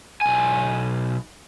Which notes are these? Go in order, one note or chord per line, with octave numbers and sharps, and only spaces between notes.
B1 G#5